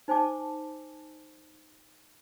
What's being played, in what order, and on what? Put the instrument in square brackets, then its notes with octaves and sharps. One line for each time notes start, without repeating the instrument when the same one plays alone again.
[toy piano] D#4 C5 G#5 A5 D6